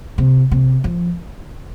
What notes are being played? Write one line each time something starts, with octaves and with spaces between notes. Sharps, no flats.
C3
C3
F3